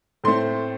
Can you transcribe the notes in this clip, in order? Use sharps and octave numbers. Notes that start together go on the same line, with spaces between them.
A2 A3 C4 C6